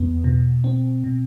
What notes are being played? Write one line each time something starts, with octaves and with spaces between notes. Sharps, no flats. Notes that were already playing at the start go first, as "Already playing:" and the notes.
Already playing: E2 B3
B2
C4
B2